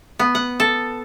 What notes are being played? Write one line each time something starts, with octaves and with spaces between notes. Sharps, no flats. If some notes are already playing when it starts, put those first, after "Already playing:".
B3
F#5
A4